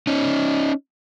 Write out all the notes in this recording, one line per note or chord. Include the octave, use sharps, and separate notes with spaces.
C#4 D#4